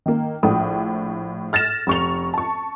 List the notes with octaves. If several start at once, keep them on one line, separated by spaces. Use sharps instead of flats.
D#3 A#3
A#1 A2 D#6
F6 A6 A#6 E7
F1 C#6 F7
A5 C#6